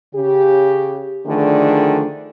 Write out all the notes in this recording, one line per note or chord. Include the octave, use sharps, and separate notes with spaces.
C#3 G4
D3 D#3 F3 A3 D4 G#4